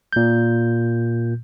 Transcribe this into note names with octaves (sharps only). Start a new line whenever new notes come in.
A#2 G6